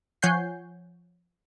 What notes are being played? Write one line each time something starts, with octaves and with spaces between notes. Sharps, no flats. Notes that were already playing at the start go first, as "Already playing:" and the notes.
F3 C#5 F#5 G#5 G6 C7